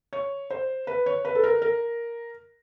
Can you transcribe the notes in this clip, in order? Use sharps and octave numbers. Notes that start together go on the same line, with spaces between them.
C#5
C5
B4
C#5
B4
A4
A#4
A#4